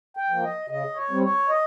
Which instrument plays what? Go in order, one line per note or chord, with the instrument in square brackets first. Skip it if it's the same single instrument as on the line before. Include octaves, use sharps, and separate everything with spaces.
[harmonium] G5
F3 A#3
D#5
C#3 D#5
C#5
G3 C4
C#5
D#5